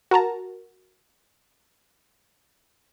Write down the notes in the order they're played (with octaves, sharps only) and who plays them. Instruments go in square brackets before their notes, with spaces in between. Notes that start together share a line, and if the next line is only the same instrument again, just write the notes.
[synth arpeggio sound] F#4 A#4 A5 A#5